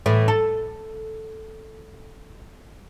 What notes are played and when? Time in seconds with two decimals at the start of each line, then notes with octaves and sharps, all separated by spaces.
0.06 A2 E3
0.28 A4